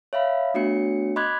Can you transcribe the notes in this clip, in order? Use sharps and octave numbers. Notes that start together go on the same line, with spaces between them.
C#5 E5 F5 B5
A3 B3 D4 F#4 C#5 C#7
D#5 B5 C6 D6 F#6 G#6